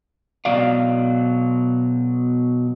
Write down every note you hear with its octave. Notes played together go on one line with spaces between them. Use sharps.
B2 F#3 D5 F5